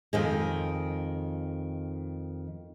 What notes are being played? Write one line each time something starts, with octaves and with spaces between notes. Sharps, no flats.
F2 D#3 G#3